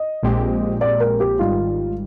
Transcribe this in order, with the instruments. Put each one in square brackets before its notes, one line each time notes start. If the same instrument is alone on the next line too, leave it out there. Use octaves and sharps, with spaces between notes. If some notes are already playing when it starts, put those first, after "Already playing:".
Already playing: [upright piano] D#5
[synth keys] A#1 A#2 G#3 C4 G4
[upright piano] D5
A#4
G4
[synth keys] G#1 G#2 D#3 G3 [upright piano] F4